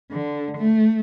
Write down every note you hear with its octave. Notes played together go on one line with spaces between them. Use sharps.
D3
A3